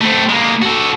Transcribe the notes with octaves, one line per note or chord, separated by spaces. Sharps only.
A3 C4
G#3 A#3
F#4 A4